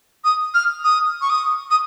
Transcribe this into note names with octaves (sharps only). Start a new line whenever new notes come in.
D#6
F6
D#6
C#6
D#6
D#6